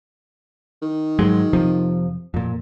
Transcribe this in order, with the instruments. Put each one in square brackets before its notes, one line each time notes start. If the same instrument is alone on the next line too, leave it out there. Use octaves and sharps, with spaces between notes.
[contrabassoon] D#3
[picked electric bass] G#2 F#3 G#3
F2 C3 F3
F2 A#2